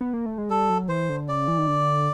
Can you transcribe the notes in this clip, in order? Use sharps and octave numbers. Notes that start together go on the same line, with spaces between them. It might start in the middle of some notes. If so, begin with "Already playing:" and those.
B3
A#3
A3
G#3
G3 A4
F#3
E3 C5
D3
C#3 D5
E3
D#3
D3